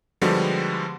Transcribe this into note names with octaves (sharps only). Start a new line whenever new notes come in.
D3 F3 G3 G#3 B3 F#4